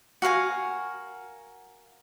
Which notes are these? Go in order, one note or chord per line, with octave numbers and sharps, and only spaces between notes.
F#4 A#4 F5 G#5